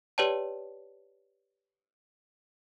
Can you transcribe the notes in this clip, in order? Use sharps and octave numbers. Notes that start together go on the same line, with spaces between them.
G4 B4 C#5 D5 G5 A5